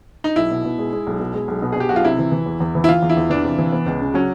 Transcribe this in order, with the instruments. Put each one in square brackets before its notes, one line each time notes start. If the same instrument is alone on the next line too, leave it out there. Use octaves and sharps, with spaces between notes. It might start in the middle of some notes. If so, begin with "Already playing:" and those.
[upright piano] D#4
[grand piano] B1 [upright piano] E4
[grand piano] B2
B2
G#3
G#3
B1
B2
G#3
B1
B2
[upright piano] G#4
[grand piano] B2 [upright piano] G4
[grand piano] B1 [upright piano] F#4
[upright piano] F4
[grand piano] C3 [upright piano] E4
[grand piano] E3
E3
E2
E2
E3
[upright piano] E4
[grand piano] E3 [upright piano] F4
[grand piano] E2
[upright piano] E4
[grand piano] E2
[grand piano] E3 [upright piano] D4
[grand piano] C3
E3
B3
C#2
C#3
[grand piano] F#3 [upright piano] C#4